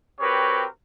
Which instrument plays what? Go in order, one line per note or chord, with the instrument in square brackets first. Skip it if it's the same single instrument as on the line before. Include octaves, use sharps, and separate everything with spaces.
[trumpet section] C4 F#4 G4 A#4 B4 C#5